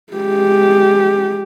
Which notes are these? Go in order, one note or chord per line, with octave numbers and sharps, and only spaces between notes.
G#3 G4